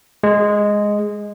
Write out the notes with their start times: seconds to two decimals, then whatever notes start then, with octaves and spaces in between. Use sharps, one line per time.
0.23 G#3